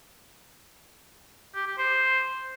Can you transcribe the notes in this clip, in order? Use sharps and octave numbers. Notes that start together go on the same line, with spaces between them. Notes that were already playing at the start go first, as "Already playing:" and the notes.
G4
G4
C5